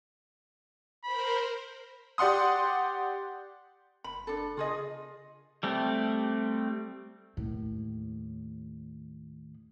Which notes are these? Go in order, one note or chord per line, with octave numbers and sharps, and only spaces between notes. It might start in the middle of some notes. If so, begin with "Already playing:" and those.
A#4 C5 B5
G4 D5 F#5 C6 D#6
F#1 B5
D4 A4
C#3 F4 G#4 D#5
G3 A3 C4
D#2 A2